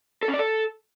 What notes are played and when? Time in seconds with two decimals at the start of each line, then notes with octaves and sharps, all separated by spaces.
0.23 A4
0.28 C#4
0.34 D5
0.39 A4